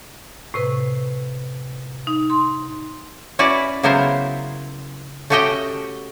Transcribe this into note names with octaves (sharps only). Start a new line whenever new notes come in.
A2 C3 B4
D#4
C6
C#4 E4 F#4 B4 D5
C#3 F#3 B3 E4 A#4 C5
A3 C#4 F#4 G4 D#5 G5